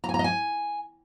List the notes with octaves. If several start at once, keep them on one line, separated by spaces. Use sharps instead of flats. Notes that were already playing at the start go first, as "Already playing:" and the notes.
A#5
G#5
A#5
D#5
G#5